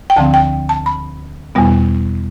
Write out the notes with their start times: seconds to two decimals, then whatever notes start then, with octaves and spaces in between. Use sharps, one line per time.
0.10 G5
0.16 D2 D3 F3 C4 A5
0.34 G5
0.69 A5
0.86 B5
1.55 E2 B2 G3 B3